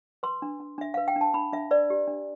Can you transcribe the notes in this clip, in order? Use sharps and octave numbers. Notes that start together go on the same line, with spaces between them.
B4 C6
D4
D4
D4 E5
B4 F5
G5
D4 A5
D4 B5
D4 E5
B4 D5
G4
D4